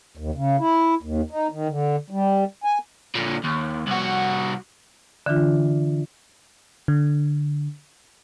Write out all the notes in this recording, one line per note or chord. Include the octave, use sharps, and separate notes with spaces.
D#2
C#3
E4
D#2
D#4
D#3
D3
G3
G#5
A#2 D3
D#2
C2 F#4
D3 E3 D4 F4
D3